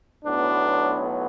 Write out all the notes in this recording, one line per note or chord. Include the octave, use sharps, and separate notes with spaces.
B1 A2 F#3 B3 D4